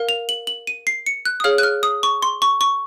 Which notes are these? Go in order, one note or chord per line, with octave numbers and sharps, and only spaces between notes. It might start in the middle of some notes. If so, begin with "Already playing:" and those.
Already playing: A#4 F5
F7
F#7
F#7
D#7
C7
C#7
F#6
D#6
G#4 C#5 F5 F6
F#6
F6
D#6
C#6
C6
C#6
C#6